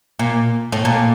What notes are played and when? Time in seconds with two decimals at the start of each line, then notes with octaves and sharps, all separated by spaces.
0.19 A#2
0.72 A2
0.85 A#2